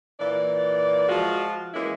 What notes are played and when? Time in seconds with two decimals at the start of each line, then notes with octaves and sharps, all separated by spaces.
0.20 A#2 E3 D5
1.09 F3 G#3 F4 F#4
1.74 E3 G#3 A#3 C#4 E4